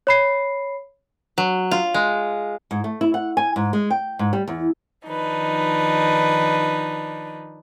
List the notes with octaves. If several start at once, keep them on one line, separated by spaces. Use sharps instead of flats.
C#5 B5 C7
F#3
F4
G#3
G#2
A3
E4
F#5
G#5
G#2
G#3
G5
G#2
G3
E2
D#3 F3 D4 D#4 B4